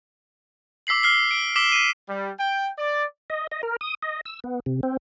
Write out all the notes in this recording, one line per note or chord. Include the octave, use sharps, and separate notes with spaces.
D6 E6 B6 C7 F#7
F6 C7 G7
D7
D6 E6 B6 E7 F#7 G7
B6 D#7
G3
G5
D5
D#5
D#5
A#4
D#6
D#5
E6
B3
C3
C4